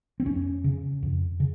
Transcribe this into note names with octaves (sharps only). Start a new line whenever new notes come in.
C4
F2 C#4
C#3
F2
C#3